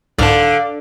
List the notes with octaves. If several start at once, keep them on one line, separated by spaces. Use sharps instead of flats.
C2 G#2 D3 D5 F5 A5